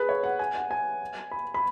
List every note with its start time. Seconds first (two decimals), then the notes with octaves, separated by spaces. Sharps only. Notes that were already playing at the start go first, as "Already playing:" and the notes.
Already playing: G#4 B4
0.09 C#5
0.24 F#5
0.39 G#5
0.55 F#5
0.71 G#5
1.31 B5
1.54 B5